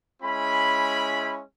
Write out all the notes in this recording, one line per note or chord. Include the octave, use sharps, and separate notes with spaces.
G#3 C#4 E4 B5